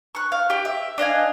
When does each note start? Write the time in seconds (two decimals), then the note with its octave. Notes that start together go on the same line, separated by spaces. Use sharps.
0.15 C#6 F#6
0.32 F5
0.50 G4 G5
0.65 E5
0.98 D4 D#5 F5 G#5